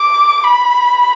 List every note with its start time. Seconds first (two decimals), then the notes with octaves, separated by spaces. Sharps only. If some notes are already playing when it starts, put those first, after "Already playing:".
Already playing: D6
0.44 B5